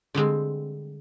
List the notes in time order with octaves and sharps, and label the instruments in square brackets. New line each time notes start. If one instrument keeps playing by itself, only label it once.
[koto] D3 G3 G#3 C4